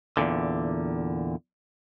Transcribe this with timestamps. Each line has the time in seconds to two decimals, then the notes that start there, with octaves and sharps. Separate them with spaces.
0.17 E2 G2 A#2 D3